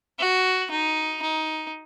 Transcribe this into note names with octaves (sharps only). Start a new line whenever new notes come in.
F#4
D#4
D#4